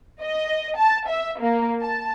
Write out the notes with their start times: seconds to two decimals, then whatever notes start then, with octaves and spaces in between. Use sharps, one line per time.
0.22 D#5
0.77 A5
1.09 E5
1.40 A#3
1.82 A5